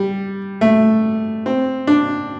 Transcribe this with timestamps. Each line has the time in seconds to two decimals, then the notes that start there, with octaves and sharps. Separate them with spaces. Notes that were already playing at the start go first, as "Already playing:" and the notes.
Already playing: G3
0.61 A3
1.46 C4
1.87 D4